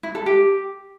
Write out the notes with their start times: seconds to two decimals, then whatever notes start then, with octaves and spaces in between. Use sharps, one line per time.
0.03 E4
0.15 A4
0.26 G4